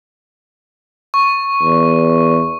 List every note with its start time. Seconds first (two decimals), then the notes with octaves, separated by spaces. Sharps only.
1.14 C#6
1.62 E2